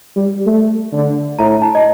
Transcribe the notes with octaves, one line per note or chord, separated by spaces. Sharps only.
G3
A3
D3
A2 A#5
A5
D#5